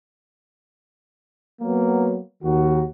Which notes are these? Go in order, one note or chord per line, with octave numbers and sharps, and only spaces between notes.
F#3 A#3 B3
D#2 D#3 F#4